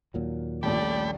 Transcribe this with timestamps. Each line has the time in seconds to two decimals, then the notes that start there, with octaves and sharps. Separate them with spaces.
0.14 D#2 A#2 F#3
0.63 D#1 A#1 A3 D5 G5 B5